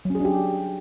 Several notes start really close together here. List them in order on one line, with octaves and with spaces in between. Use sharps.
F#3 C#4 G#4 D4 G4